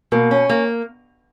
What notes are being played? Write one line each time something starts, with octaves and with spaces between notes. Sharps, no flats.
B2 A#3
C#4
A#3